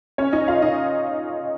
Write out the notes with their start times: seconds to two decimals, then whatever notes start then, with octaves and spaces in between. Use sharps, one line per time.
0.18 C#4 C#5
0.32 D#4 D#5
0.48 F4 F5
0.62 D#4 D#5